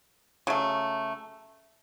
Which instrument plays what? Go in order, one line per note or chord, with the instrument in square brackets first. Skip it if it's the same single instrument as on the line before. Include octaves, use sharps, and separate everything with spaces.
[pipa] C#3 F#3 A3